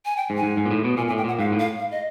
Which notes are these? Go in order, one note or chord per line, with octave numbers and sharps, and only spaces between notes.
G#5
G5
G#2
G#5
G#2
G#2
A#2
A2
B2
A#2 G#5
G#5
A2
G5
A#2 F#5
G#2 F5
A2
F5
F5
D#5